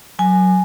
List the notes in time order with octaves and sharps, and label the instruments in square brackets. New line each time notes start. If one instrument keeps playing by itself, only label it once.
[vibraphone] F#3 G#5